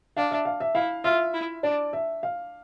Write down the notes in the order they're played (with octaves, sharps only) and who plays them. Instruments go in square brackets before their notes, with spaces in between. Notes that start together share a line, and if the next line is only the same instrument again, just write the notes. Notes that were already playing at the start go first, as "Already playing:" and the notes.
[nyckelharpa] D4 [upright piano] F5
[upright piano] E5
F5
E5
[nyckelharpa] E4 [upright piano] F5
[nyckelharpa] F4 [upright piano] E5
[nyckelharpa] E4
[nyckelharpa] D4 [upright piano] D5
[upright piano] E5
F5